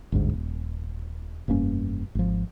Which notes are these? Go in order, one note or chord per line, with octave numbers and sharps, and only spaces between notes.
G1 D2 G#2
D#1
F1 G2 A#3 C#4
G#1 F3